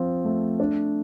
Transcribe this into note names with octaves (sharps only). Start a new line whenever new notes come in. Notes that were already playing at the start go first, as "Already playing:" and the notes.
Already playing: F3 C4 F4
A3
D4